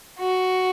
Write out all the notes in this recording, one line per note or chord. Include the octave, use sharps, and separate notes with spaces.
F#4